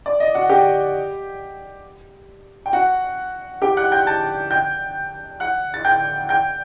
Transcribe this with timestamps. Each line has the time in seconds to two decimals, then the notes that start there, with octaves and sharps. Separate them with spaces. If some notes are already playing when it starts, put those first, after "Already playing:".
0.06 D5
0.20 D#5
0.34 F#4 F#5
0.49 G4 G5
2.66 G5
2.73 F#4 F#5
3.62 G4 G5
3.77 F#5 F#6
3.92 G5 G6
4.07 A5 A6
4.51 G5 G6
5.40 F#5 F#6
5.74 A6
5.85 G5 G6
6.29 G5 G6